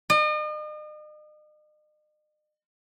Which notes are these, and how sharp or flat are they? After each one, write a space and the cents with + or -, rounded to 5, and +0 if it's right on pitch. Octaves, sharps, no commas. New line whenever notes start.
D#5 -40